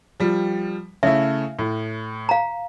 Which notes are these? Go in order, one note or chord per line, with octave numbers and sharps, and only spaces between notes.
F3 G3
C#3 A3 E4 E5
A2
F5 A#5